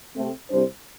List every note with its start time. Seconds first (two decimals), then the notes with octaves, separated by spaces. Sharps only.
0.15 C3 A3 C4
0.50 C2 C3 G3 D4 C5